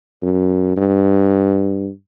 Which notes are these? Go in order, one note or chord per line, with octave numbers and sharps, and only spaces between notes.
F#2
G2